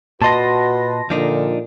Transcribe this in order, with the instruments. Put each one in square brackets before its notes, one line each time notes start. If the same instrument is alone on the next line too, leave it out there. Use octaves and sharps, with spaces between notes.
[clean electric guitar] A#2 D#5 [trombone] F#4 [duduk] B4 [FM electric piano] A5 C6 A#6
[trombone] A#2 [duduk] D3 [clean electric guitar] F3 D4 D#4